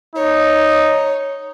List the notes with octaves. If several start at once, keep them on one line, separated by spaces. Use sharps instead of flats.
D#4 C#5